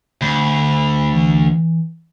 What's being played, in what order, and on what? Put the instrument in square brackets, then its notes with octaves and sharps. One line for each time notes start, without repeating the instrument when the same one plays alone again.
[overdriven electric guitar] D2 [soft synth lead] B5
[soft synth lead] E3